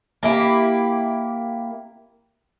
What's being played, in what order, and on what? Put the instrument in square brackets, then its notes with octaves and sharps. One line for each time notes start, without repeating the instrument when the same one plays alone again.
[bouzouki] A#3 E4 G4